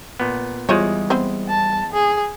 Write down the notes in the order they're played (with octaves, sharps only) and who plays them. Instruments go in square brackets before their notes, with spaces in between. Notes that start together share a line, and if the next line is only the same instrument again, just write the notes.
[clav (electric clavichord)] A#2 B3
[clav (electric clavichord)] E2 G#3 [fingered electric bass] G3 [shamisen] F4 C5 C#5
[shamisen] B3 C4 C5
[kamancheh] A5
G#4